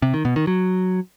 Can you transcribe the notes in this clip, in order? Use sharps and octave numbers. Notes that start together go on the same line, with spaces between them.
C3
D#3
B2
D#3
F#3